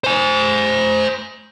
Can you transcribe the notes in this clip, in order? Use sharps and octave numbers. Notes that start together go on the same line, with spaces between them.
C5 G#5